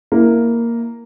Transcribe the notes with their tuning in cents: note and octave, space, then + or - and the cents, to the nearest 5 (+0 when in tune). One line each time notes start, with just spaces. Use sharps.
A#3 +0 E4 +0